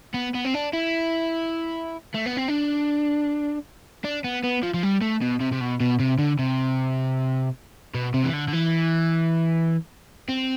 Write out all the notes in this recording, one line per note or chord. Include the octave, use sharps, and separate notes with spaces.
B3
B3
C4
D4
E4
A3
B3
C4
D4
D4
B3
B3
F3
F3
G3
A3
B2
C3
C3
B2
B2
C3
D3
C3
B2
C3
E3
D3
D3
E3
C4